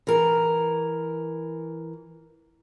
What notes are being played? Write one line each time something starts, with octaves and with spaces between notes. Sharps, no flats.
E3 A#4